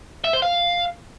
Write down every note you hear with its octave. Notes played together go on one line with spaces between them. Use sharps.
E5
C5
F5